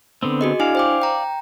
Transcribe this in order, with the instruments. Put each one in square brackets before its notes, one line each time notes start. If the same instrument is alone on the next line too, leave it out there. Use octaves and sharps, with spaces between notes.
[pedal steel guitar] D3 B3 C4
[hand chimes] F#4 G#4 D#5
[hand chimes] D4 E4 G#5 [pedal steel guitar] D5 F5
[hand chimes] C5 G5 D6
G5 A#5